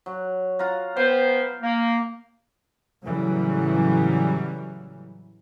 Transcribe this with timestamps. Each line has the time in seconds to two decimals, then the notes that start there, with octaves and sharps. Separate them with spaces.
0.06 F#3
0.59 F4 F#5 A#5
0.97 B3 B4 C5 G5
1.62 A#3
3.03 A2 C#3 E3 F#3 G3